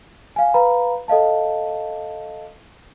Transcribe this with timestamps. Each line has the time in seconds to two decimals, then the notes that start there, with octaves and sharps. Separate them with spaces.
0.36 F5 G#5
0.54 B4 F5 A#5 B5
1.08 A4 D#5 F5 A5